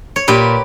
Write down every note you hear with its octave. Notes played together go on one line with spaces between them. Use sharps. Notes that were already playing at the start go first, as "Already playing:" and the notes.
C#5
A#2 G4 B4